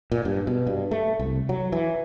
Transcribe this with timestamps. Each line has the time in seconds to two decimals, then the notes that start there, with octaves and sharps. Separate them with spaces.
0.12 A#2
0.25 G2
0.47 B2
0.67 G2
0.91 A3
1.19 C2
1.49 F#3
1.72 E3